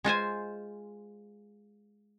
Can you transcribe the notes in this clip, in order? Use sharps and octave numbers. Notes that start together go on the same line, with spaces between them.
G#3 F4 C5 G#5